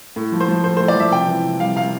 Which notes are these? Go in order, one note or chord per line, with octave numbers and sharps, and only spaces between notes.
A2
F3
C5
F3
A2 C5
A2 C5
D5
F3 E5
C3 G5
E3
C3
G3 F5
C3 F5